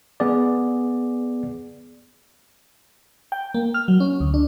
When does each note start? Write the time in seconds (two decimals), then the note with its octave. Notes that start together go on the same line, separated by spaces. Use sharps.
0.20 B3 G#4 D5
3.32 G5
3.54 A#3
3.74 F6
3.88 F#3
4.00 C#4
4.20 D2
4.34 D4